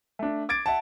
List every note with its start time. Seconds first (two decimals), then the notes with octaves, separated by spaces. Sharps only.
0.19 A3 D4
0.49 D6 G#6 A6 D7
0.66 E5 F#5 A5